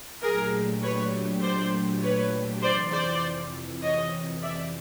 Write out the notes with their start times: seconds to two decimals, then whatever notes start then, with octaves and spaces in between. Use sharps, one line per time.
0.22 A#2 F#3 A3 D4 G4 G#4 A#4
0.82 B4 C#5
1.43 C5 D5
2.02 B4 C#5
2.62 F2 C3 E3 C5 D5
2.92 C5 D5
3.82 C#5 D#5
4.42 D5 E5